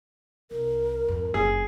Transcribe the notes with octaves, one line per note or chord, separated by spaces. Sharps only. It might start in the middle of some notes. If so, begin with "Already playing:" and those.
C2 A#4
F2 G#2
F#1 F2 G#4